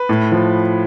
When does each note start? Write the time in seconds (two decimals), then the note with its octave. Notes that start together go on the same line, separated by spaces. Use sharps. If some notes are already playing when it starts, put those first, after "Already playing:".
Already playing: B4
0.09 A2
0.32 F3